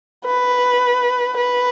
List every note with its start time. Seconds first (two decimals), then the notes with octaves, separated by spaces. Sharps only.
0.25 B4
1.37 B4